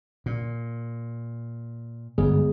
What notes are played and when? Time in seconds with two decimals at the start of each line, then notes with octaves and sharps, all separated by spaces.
0.26 A#2
2.18 G1 D2 G#3 B3 G#4